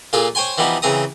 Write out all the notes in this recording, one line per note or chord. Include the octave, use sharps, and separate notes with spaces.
A#2 F4 G#4 A4
C5 C#5 G5 G#5 C6
E3 F3 G3 B3 D#4
C#3 E3 C4 A#5 D#6